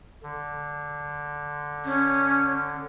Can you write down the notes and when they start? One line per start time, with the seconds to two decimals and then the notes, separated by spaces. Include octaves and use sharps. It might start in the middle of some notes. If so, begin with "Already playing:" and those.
0.23 D3
1.85 C#4